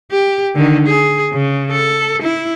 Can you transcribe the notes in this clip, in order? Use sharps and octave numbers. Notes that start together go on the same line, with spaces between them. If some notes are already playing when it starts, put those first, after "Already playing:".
G4
D3 D#3
G#4
C#3
A4
E4